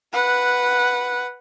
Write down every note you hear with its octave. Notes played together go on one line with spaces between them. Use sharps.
B4 F#5